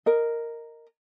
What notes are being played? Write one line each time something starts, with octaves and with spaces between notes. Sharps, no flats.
A#4 D#5